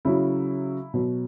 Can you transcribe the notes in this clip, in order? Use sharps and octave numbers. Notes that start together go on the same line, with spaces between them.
C#3 F#3 E4
B2 F#3